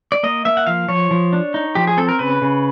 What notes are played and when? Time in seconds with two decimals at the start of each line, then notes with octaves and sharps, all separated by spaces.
0.12 D5
0.23 A#3 D#5
0.45 A#3 E5
0.57 F#5
0.67 F3 F5
0.88 F3 C#5
1.11 F3
1.33 D4
1.54 D#4
1.75 F3 G4
1.87 G#4
1.97 C4 A4
2.09 A#4
2.19 C#3 B4
2.42 C#3